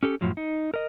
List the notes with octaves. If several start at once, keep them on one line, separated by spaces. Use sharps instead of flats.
C#4 G4 A4
F#2 A2 F3 F#3
D#4
A#4 D#5